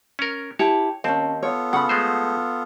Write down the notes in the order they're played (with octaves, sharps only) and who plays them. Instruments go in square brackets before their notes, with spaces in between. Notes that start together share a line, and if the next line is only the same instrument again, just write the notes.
[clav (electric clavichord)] C#4 A#4
[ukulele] E4 G4 A5 [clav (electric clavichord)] C#5
[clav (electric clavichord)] D#2 C4 [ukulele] C#4 A5
[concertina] B3 F4 A4 [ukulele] C#5
[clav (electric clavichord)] C#3 [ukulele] F#5 B5
[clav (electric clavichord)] G#3 A3 C5